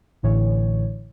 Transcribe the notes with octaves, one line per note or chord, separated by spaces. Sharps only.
A1 A2 D3 E3 C#5